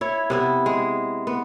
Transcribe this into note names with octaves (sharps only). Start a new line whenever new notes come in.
E4 C#5
C3 B3 E4
G#3
B3